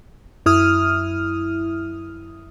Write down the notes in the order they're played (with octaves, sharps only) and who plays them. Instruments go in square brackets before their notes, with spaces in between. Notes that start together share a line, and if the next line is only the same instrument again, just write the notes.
[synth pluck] F#2 E4 D#6 F6